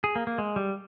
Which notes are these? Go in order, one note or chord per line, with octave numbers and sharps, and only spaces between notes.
G#4
A#3
A#3
G#3
G3